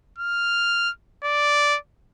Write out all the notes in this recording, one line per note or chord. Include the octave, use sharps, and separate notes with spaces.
F6
D5